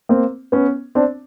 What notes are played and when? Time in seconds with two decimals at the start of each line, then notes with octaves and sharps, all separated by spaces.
0.09 A#3 C4
0.52 B3 C#4
0.95 C4 D4